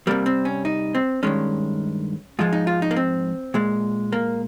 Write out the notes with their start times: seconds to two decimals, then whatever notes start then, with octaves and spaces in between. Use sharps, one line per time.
0.07 C3 G3 A#3
0.26 C4
0.45 C#4
0.65 D#4
0.95 C4
1.23 G2 D#3 G#3 C#4
2.39 G#2 F3 G#3 F4
2.53 D#4
2.67 F4
2.82 D#4
2.91 A#3
2.96 C4
3.54 A#2 G#3
4.12 A#3